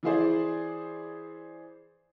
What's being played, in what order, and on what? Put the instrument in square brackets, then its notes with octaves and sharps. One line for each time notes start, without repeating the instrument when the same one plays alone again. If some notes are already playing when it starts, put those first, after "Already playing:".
[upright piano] E3 E4 G#4 C5 D5